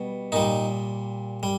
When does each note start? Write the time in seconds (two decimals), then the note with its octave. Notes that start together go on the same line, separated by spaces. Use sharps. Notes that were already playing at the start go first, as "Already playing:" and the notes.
Already playing: B2 G3
0.32 A#2 G3 D#4
1.43 G3